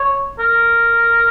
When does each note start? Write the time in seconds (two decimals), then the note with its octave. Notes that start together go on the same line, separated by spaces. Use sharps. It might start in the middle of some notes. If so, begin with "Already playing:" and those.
Already playing: C#5
0.39 A#4